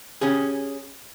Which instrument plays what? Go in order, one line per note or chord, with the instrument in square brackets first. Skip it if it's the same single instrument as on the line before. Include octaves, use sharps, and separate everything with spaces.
[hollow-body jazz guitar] C#4 G4 G#4